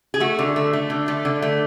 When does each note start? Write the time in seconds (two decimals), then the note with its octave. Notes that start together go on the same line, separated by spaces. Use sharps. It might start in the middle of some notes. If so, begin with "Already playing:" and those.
0.14 G#4
0.20 A3 F#4
0.39 D3
0.56 A3
0.73 A3
0.90 D3
1.08 A3
1.25 D3
1.42 A3